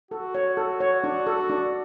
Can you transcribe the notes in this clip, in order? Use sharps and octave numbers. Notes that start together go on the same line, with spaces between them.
F#4 A4
C#5
A4
C#5
D4
A4
D4